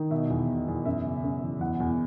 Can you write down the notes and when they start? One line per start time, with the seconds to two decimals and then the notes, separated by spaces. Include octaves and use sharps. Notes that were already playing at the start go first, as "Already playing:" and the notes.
Already playing: D#3
0.11 B2 E5
0.30 E2
0.49 B2
0.68 E2
0.86 F#2 E5
1.05 C#3
1.23 F#2
1.42 E3
1.60 E2 F#5
1.80 E2